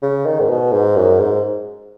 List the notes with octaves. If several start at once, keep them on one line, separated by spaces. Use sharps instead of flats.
C#3
D#3
G#2
B2
G#2
F#2
G#2